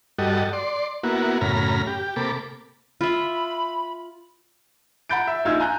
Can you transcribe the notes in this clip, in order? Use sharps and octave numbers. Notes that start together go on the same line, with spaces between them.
G2 G3 F#4 A4 D#5
D5 C6
A#3 B3 E4 F#4
F#2 A2 C#3 A#5 B5 F6
G4
C3 A#3 A4 B5 D6
F4 E5 B5
F#5 A#5 B5 G6 A6 D7
E5
A#1 D#4 F4 E6 G#6
G#5 A#5 F#6 G6